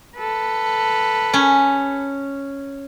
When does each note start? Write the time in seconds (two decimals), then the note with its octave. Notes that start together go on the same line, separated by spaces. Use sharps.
0.17 A4 B4
1.33 C#4